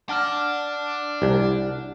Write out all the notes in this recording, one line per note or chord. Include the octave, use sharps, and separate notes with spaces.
D4 D5 F#5 A5 F6
C2